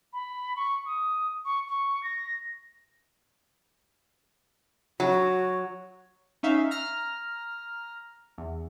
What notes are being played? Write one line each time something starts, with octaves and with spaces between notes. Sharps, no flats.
B5
C#6
D#6
C#6
C#6
A#6
F#3 F#4
C#4 D#4 E5 F5
A#5 F6
E2